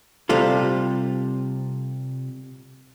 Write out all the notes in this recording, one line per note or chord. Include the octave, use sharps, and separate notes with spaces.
C3 G3 C4 F4 A4